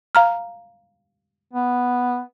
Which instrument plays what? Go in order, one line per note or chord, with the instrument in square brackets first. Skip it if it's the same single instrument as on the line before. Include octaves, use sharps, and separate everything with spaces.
[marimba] F5 A#5 F6
[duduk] B3